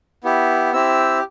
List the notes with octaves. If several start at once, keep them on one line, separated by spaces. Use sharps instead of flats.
B3 E4 G4
C4 E4 G4 E6